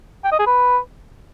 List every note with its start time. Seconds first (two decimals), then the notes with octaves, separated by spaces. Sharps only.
0.24 G5
0.32 D#5
0.39 G#4
0.47 B4